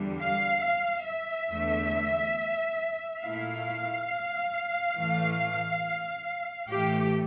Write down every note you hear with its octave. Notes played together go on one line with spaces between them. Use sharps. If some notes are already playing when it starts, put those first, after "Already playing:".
Already playing: E2 D3 G3
F5
F5
E5
E2 D3 A3
A#2 A3 E4 F5
A2 E3 A3
A2 E3 A3 G4